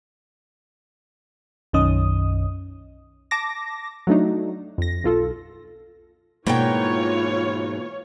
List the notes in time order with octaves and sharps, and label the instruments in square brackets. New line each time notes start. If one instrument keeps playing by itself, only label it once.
[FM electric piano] B1 F#2 D#3 C#4 D#5 D#6
[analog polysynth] A5 D6 A#6
F#3 A3 D4 D#4
F2 A#6
B1 F4 A4
[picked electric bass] G#2 [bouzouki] B2 A#4 G5 [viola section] E3 F4 C#5 [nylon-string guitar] A#3